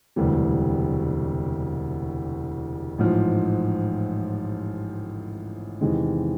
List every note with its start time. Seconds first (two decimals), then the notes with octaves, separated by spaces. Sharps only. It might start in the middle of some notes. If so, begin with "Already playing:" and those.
0.16 E1 D2 C3 E3 G3
2.98 A1 G#2 F3
5.81 E2 C3 D#3 G#3